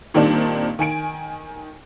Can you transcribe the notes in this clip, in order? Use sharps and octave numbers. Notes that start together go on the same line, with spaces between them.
A#2 D#3 G3 C4 D4 D#4
D#3 G#5 D7